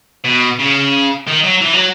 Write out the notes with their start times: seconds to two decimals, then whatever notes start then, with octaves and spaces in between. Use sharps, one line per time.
0.24 B2
0.59 C#3
1.28 D#3
1.44 F#3
1.61 E3
1.73 F#3